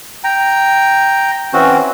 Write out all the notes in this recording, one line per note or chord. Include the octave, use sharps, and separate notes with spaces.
G5 A#5
E3 C4 C#4 F#4